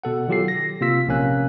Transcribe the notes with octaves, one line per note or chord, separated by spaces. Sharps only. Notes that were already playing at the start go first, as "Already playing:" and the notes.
B2 A4 F#5
D#3 F#3 F4 G4 A4 C7
A#6
C3 A#3 F4 E6 B6
A#1 C3 A#3 C#4 G#5 F#6